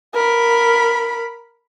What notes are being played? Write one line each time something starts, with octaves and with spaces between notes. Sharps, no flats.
A#4 B5